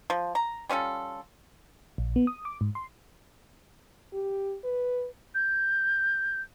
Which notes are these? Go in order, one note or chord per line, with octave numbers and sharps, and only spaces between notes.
F3
A#5
G3 C#4 F4 A4
A#1
B3
D#6
D6
G#2
C6
G4
B4
G6